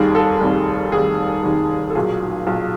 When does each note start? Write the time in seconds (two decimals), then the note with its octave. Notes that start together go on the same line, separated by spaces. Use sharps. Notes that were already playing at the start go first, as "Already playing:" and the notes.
Already playing: F1 D#2 D#3 G3 G#4
0.15 A4
0.41 F1 D#2 D#3 G3
0.92 F1 D#2 D#3 G3 G#4
1.43 F1 D#2 D#3 G3
1.90 A4
1.95 B1 A#2 F#3 G#4
2.47 B1 A#2 F#3